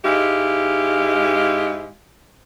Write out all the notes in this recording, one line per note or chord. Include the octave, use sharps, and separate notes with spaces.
G#2 G#3 E4 G4 F5